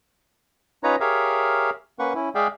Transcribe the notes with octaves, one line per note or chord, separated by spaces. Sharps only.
C#4 D#4 F4 B4 C#5 A#5
G4 G#4 A#4 C#5 E5 F5
A#3 C#4 B4 F#5 C#6
C#4 E4
G#3 G#4 D5 E5 F5 G5